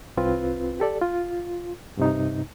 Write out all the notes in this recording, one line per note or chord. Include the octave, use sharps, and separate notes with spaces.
C2 C4 F4 B4
G4 A4 D5
F4
G2 C3 D#4